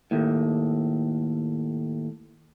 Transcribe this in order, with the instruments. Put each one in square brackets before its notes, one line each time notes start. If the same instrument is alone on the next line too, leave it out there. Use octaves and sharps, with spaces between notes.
[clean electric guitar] D#2 A2